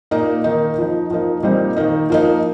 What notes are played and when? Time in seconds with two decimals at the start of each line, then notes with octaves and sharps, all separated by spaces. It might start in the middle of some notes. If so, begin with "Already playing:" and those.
0.11 A#2 A#3 D#4
0.44 D#3 A#3 D#4
0.78 F3 D#4
1.10 F3 A#3 D#4
1.43 A#2 G3 C4 D#4
1.76 D#3 A#3 D#4
2.10 F3 A#3 D#4